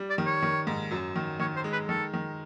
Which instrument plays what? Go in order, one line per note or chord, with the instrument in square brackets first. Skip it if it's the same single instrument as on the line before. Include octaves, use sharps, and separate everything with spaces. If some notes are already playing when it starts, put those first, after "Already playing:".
Already playing: [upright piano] G3
[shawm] D5
[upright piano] D#3
[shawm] C#5
[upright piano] D#3
G#2
F#2
D#3
[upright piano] D#3 [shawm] C#5
[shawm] C5
[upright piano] G#3
[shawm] B4
[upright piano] D#3 [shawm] A4
[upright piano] D#3